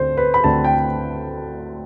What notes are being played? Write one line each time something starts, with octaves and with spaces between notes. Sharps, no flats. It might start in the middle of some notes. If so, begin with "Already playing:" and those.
Already playing: D2 D3 A3 C4 C5
B4
B5
D2 D3 A3 C4 A5
G5